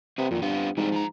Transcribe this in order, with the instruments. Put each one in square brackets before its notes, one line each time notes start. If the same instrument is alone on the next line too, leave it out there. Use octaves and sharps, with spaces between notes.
[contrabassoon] C3 [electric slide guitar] C4 B4
[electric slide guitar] F2 D#3 [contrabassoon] A#2
[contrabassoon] G2 [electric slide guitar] B3 C4 F4
[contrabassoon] G#2 [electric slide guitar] E3 G3 C4
[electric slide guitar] F3 A#5